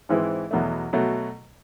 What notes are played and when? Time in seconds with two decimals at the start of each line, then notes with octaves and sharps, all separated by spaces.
0.09 G#2 E3 G#3 C4 E4
0.51 E2 B2 F#3 A3
0.93 B2 F#3 A3